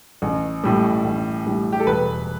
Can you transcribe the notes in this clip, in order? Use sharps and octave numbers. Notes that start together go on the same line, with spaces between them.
A1
A2 G3
A1
A2 G3
G4
A4
E1 B4